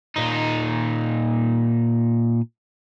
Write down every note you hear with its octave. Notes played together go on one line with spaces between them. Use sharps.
A#2 D#4